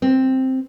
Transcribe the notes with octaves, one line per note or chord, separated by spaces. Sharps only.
C4